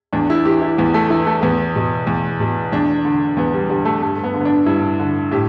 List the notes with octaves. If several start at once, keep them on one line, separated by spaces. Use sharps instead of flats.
E2 D4
E4
E3 G4
E4
E2 B3
A3
E3 E4
A3
E2 B3
B2
E2
B2
E2 D4
D3
E2 B3
G3
D3 G3
A3
G2 A3
B3
D3
B3
D4
G2 E4
D3
A2 G4